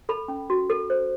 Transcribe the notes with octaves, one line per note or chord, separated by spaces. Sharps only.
A4 B5
C#4
F#4
A4
C5